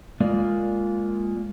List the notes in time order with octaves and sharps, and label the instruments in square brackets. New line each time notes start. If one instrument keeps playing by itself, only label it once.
[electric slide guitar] G#3 A#3 F4 D5